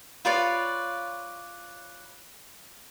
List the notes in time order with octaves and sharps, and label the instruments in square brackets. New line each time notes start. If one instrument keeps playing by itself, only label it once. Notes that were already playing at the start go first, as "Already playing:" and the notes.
[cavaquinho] F4 B4 C#5 D5